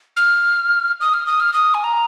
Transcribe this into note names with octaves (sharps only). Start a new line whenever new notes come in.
F6
D#6
F6
D#6
F6
D#6
G#5
A#5